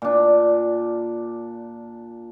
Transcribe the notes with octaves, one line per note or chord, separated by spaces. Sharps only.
A#2 D4